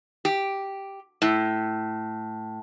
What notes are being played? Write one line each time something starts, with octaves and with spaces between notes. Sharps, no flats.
G4
A2